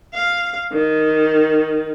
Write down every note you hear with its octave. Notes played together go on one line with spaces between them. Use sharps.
F5
D#3